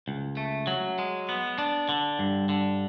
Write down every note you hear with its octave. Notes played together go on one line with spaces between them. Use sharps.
C#2
A3
F#3
G#3
B3
D4
D3
G2
D3